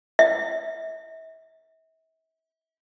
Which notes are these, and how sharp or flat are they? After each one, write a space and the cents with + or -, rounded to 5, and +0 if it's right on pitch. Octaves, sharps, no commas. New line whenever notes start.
E5 -35